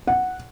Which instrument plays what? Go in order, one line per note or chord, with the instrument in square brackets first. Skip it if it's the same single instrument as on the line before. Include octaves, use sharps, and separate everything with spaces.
[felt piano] F#5